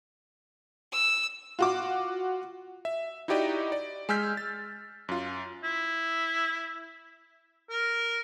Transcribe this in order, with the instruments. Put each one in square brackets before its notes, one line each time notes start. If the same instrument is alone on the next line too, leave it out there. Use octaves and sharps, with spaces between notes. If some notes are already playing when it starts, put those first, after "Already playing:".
[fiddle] E6
[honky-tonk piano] F4 F#4 D6
[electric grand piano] E5
D#4 E4 F#4 G4 D5 D#5
D5
G#3 G#5 E6 F6 G6 B6
A6
F#2 F4
[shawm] E4
A#4